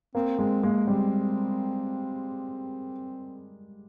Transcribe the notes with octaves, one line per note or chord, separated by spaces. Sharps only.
A#3 C4
G#3 C4
G#3 A#3
G3 C4